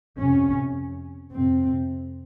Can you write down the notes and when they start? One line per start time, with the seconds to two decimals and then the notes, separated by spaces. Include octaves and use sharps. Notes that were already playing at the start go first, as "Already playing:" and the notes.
0.18 F2 C3 C#4
1.32 F2 C3 C4